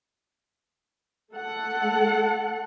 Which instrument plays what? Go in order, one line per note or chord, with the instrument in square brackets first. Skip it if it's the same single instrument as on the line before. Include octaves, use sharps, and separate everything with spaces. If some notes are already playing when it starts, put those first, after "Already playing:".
[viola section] A3 A4 F#5